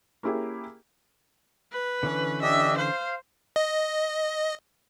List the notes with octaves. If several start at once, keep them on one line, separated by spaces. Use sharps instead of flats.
A#3 C#4 E4 G4 G#4
B4
D3 E3 C#4
D4 G4 D#5 E5
C5 F5
D#5